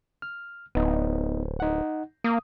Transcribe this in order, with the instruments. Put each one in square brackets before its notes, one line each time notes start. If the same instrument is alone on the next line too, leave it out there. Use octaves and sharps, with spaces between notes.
[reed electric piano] F6
[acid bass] D1 [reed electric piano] B3 D#4
[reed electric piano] D#4 F#5
[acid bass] A#3 [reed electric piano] D#6